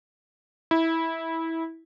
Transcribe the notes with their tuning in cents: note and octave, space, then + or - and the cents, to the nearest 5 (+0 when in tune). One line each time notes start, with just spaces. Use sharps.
E4 -15